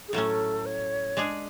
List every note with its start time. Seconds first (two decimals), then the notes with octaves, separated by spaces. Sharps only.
0.08 G#4
0.13 A2 F#3 A3 C#4 A4
0.66 C#5
1.17 G#3 D4 G#4